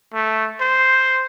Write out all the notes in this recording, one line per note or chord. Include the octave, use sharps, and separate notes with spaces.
A3
C5